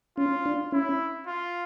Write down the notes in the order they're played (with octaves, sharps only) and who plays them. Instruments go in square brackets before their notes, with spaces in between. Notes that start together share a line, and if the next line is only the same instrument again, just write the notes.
[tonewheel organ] C#4 [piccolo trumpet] F4
[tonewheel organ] D4
[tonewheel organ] C#4 [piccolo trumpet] E4
[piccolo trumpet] F4